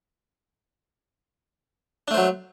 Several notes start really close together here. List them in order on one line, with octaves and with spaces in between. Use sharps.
D4 A3 C5 F#3